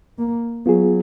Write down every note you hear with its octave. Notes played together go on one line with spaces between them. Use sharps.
A#3
F#3 B3 F4 G#4